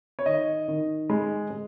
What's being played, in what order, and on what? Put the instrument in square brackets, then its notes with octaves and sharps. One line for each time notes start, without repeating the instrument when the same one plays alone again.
[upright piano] C#5
D#3 D#5
D#3
G#3
G#3